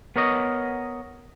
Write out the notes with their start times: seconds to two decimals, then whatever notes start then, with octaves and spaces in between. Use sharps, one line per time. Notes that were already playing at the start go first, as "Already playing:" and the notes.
0.16 B3 A#4 C#5 D#5